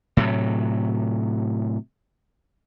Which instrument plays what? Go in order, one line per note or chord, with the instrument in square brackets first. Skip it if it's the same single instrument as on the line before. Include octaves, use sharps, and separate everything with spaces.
[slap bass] A2 C3 F#3